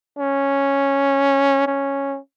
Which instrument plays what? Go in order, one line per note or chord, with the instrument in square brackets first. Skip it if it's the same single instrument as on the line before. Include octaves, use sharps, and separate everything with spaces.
[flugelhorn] C#4
C#4